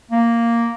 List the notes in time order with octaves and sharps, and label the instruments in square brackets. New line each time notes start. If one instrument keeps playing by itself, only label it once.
[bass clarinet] A#3